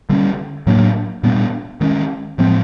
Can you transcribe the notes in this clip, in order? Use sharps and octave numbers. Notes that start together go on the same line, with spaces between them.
D3 G3 A#3 C#4
A2 F#3 A#3 D4
A#2 G3 B3 D4
D#3 G#3 C#4
A2 F3 G#3 C4